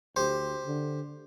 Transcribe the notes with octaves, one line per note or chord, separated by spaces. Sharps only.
D2 G4 C5
D3